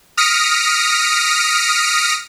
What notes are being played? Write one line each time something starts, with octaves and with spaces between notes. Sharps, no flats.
D#6 F6 A#6 B6 C#7 D7